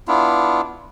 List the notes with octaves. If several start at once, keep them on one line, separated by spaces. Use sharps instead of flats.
B3 D4 E4 F4